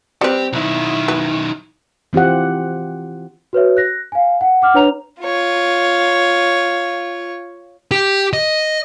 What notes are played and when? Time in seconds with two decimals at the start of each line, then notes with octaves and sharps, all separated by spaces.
0.21 G3 C4 G4 B4
0.53 B1 D#3 E4
1.08 B4
2.13 E3 C4 F4 G4 F#5
3.53 F#4 B4 C#5 E5
3.77 F#6 A#6
4.12 F5 G#5
4.41 F#5
4.62 F#5 D6 F6
4.74 D4 B4 C#5 A#5 F7
5.21 F4 C#5
7.91 G4
8.33 D#5